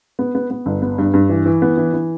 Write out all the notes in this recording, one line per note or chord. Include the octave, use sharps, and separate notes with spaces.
B3
B3
B3
G1
B3
G2
G2
E3
E3
B3
E3
E3